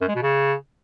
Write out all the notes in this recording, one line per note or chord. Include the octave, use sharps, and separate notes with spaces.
F#2
G#3
B2
C#3